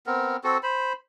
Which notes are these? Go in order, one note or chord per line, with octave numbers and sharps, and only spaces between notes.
B3 C4 A#4
C4 F#4 A4
C5 B5